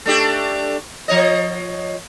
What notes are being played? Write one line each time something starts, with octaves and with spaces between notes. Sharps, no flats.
A3 D4 G4
F3 C#5 D#5